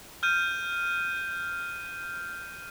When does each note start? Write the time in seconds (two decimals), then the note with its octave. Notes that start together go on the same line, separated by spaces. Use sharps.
0.23 F6 G6 D#7